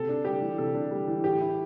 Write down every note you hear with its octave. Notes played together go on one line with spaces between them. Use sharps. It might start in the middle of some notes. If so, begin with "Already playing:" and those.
Already playing: C3 A4
D4
G3 G4
E3
C3 A4
D4
G3
E3
A2 G4
E4